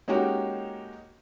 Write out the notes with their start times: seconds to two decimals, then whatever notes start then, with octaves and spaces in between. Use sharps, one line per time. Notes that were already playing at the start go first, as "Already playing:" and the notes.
0.08 G#3 A#3 C#4 D#4 F#4 G4